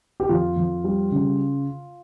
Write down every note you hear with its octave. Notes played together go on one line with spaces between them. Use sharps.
G4
F2 F4
F2
G3
C#3